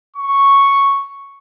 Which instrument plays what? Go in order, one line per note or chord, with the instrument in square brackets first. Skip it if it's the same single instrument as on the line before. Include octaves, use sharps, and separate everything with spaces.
[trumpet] C#6